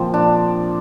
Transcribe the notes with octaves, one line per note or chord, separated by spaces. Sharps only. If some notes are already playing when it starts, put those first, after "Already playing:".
Already playing: A#2 F3 A#3 C4
D4